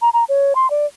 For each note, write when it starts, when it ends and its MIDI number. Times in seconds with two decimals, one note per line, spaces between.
0.02 0.09 82
0.13 0.24 82
0.29 0.53 73
0.55 0.70 84
0.70 0.86 74